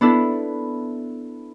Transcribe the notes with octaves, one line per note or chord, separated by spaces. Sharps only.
B3 D4 E4 A4